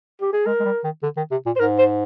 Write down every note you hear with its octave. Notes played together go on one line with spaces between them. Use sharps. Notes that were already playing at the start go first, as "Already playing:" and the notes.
G4
G#4
G#3 A#4
G#3
G3
D#3
D3
D#3
C3
A#2
C5
G#2 A#4
C5